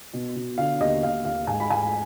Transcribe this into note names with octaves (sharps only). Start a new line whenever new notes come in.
B2
B2
D3 F5
D#2 D#5
D#2 F5
D#2 F5
G#2 G#5
B5
G#2 G#5